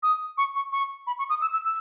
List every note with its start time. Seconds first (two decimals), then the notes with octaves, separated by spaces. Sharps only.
0.03 D#6
0.38 C#6
0.55 C#6
0.72 C#6
1.07 B5
1.19 C#6
1.30 D#6
1.41 E6
1.53 E6
1.65 E6